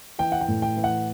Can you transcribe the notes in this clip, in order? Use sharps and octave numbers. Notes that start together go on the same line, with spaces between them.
E3 G5
F#5
G5
A2
G5
E3
F#5